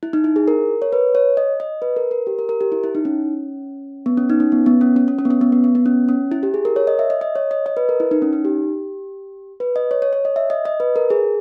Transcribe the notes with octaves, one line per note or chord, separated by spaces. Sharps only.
E4
D#4
E4
G#4
A#4
C#5
B4
C#5
D#5
D#5
B4
A#4
A#4
G4
A#4
A#4
G4
E4
E4
D#4
C#4
B3
C#4
D#4
C#4
B3
B3
C#4
C#4
C#4
C#4
B3
C#4
B3
B3
B3
B3
C#4
C#4
E4
G4
G#4
A#4
C#5
D#5
E5
D#5
D#5
C#5
D#5
D#5
B4
A#4
E4
D#4
C#4
D#4
G4
B4
D#5
C#5
C#5
C#5
D#5
E5
D#5
D#5
B4
A#4
G#4